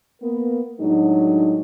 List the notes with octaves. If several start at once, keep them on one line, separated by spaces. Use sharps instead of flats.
A#3 B3 A#4
A2 F#3 G#3 D4 D#4